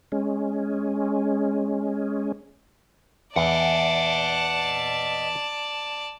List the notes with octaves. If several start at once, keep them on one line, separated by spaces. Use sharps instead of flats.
G#3 C#4
E2 D5 D#5 F#5 A5